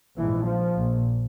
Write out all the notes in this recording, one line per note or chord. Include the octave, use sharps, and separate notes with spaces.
A#1 G#2 E3
F3
A#1 A#2